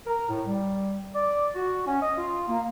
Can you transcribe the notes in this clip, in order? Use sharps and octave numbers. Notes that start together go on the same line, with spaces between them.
A#4
A2
G3
D5
F#4
C#4
D#5
F4
A#3